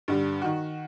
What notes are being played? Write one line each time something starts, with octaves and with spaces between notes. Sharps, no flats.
G2 D3 G3
D#3 F#4